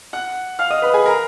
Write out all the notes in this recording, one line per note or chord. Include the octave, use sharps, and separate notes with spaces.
F#5 F#6
F5 F6
D#5 D#6
B4 B5
G#4 G#5
A#4 A#5